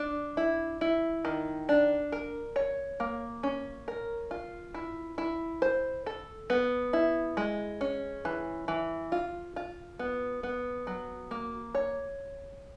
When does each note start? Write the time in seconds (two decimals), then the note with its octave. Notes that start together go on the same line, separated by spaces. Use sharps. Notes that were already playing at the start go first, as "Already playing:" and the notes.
Already playing: D4
0.37 E4
0.81 E4
1.25 D#3
1.69 D4
2.12 A#4
2.56 C#5
3.00 A#3
3.43 C#4
3.88 A#4
4.31 F4
4.74 E4
5.18 E4
5.62 C5
6.06 A4
6.50 B3
6.93 E4
7.37 G#3
7.81 C#4
8.25 E3
8.68 E3
9.12 F4
9.56 F4
9.99 B3
10.43 B3
10.87 F#3
11.31 A#3
11.75 C#5